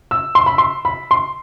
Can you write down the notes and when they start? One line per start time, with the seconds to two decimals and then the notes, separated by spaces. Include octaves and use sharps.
0.11 E6
0.35 C6
0.46 B5
0.58 C6
0.85 B5
1.11 C6